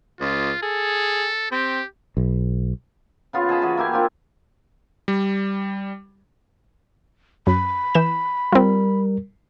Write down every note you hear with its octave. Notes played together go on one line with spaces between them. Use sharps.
C#2 F4
G#4 A4
C4 G4
B1
C#3 B3 F4
G#4 D#5 A5 B5
E3 B3 F#4 G#4
A#3 E4 G4 G#5
C4 D4 F4
G3
F#2 B5
E3 G6 E7
G3 C4 F4 A#4